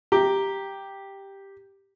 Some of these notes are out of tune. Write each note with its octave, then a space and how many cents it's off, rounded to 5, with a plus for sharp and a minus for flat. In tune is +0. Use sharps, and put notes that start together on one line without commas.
G4 +0 A#5 +0